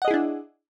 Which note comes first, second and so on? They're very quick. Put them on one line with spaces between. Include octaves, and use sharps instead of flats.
F#5 D#5 G#4 E4 D4